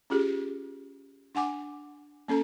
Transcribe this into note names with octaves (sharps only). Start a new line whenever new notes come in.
C#4 F4 G4 G#4
D4 F#5 G#5 D6
A#3 C#4 A4 A#5